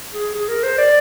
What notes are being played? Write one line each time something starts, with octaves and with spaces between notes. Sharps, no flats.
G#4
G#4
A#4
C5
D5